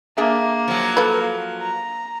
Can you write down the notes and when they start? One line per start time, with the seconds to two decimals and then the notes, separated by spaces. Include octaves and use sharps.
0.17 A#3 D4 G#4 E5
0.68 F3 F#3
0.97 A4 B4
1.62 A#5